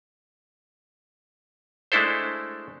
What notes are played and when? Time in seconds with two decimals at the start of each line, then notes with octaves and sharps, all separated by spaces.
1.92 G#3 A3 D4 E4 A4 C5